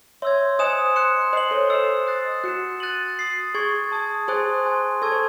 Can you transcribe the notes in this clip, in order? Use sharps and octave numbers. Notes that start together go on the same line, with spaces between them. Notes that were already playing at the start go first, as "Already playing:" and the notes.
C#5 E5 C6 E6 G#6
C5 D#5 G#5 D#6 F#6 C#7 E7
C6 F#6 C#7 E7
C5 D#5 F#6 C7 F#7
A4 C#5
C5 D#5 E6 C7 E7
D#6 F#6 A6 C7
F#4 F#6 C#7 E7
F#6 A6 D#7 F#7
D#6 A6 C7 F#7
G#4 C#6 G#6 C7 F#7
A5 D#6 G#6
G#4 C5 G#5 C6 D#6 F#6
G#5 C6 F#6
A4 A5 C#6 E6 G#6
C5